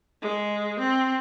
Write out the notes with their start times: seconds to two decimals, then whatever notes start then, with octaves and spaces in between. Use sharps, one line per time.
0.21 G#3
0.79 C4